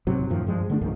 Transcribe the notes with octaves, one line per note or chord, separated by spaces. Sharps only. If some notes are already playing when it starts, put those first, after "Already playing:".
G#2 C3 F#3
F#2 A2 D#3 F3
G2 F3 G#3
D3 A3 D4
C#2 G#2 D#3 F3